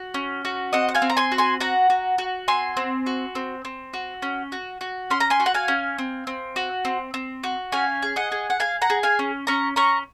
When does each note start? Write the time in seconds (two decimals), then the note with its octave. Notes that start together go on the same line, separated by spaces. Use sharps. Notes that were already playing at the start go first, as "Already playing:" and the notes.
Already playing: F#4
0.14 C#4
0.45 F#4
0.73 C4 D#5 F#5
0.88 F#5
0.95 F5 G#5
1.02 C4
1.10 A#5
1.17 G#5 C6
1.32 F#4
1.38 G#5 C6
1.60 F#4 F#5 A#5
1.90 F#4
2.18 F#4
2.48 C4 G#5 C6
2.77 C4
3.06 F#4
3.35 C4
3.65 C4
3.94 F#4
4.22 C#4
4.52 F#4
4.81 F#4
5.10 C#4 C6
5.20 A#5
5.30 G#5 C6
5.40 F#4
5.46 F#5
5.54 F5 G#5
5.68 C#4
5.98 C4
6.27 C4
6.56 F#4
6.85 C4
7.14 C4
7.43 F#4
7.72 C#4 F5 G#5
8.02 G#4
8.16 D#5 F#5
8.32 G#4
8.50 F#5
8.60 G#4 F5 G#5
8.82 F#5 A#5
8.90 G#4
9.03 F5 G#5
9.19 C#4
9.47 C#4 A#5 C#6
9.76 C#4 A#5 C#6